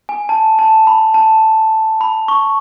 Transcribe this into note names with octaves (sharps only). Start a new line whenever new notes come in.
G#5
A5
A5
B5
A5
B5
C#6